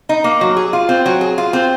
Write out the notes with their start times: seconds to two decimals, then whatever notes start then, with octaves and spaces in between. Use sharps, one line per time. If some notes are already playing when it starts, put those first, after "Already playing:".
0.09 D#4
0.24 A#3
0.41 F#3
0.57 G#4
0.73 F4
0.89 C4
1.06 F#3
1.21 G#4
1.38 F4
1.53 C4